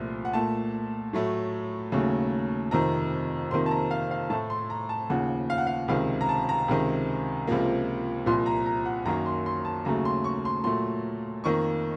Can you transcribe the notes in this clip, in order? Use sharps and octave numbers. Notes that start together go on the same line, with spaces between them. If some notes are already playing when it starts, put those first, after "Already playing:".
Already playing: C2 A#2 F3 A3
F#5
A#2 A3 A5
A2 F#3 A3
D#2 C#3 F#3 A3
F2 C3 D#3 A#5
F2 C3 D#3 A#3 C6
A5
A#5
F5
F5
A2 A3 A5
C6
A#5
A5
D#2 C#3 F3 F#5
F5
F#5
F5
C#2 C3 D#3 F5
A#5
A5
A#5
C#2 C3 D#3
C#2 C3 F3 A#3
C2 A#2 F3 C6
A#5
A#5
F#5
F#2 D#3 F#3 A#3 A#5
C6
C6
A5
D#2 C#3 F#3 A3 A#5
C6
C#6
C6
A#2 F#3 A3 C6
F2 D#3 A#3 C#6